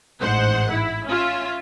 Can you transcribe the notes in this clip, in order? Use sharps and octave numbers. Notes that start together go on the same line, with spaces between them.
A1 G#2 C5 F#5
E4
C#4 F4 E5